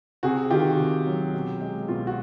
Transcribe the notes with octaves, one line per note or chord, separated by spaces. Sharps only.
C3 F#4 G#4
D#3 F4 G4
C3
F#3
B2
G#3
B2 F4
F#4